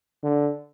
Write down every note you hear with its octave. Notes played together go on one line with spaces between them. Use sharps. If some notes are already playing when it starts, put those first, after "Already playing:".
D3